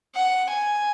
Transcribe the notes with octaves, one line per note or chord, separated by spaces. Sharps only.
F#5
G#5